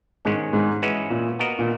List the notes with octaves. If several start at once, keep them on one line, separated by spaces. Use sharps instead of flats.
G#2 D#3 G#3 C#4
G#2
E3 G#3 C#4 F#4 B4
A#2
B3 F#4 A#4 D#5
A#2